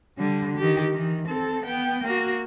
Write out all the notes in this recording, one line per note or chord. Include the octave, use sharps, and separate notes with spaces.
D3 G3
D#3 G4
D#3 E3
C4 A4
B3 G5
A#3 F#4